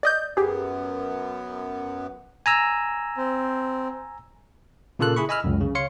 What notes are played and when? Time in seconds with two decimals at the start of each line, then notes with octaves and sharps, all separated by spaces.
0.03 D5 D#5 G6
0.37 F#2 B3 G4 G#4
2.46 G#5 A#5 E6
3.17 C4
4.99 A#2 C#3 A#3 F4 A4 F#6
5.16 E4 G#4 B5 C#6
5.29 D#5 G#5 B5 E6 F6
5.44 C#2 F#2
5.60 C#3
5.75 C#5 F5 C6 C#7